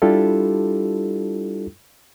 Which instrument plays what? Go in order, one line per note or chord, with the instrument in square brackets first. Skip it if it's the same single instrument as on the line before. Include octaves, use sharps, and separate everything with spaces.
[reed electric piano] G3 D4 E4 F4 G4 A4